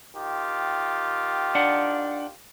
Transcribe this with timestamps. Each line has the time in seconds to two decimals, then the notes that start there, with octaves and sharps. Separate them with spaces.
0.16 D#3 F4 G4
1.55 D4 F#5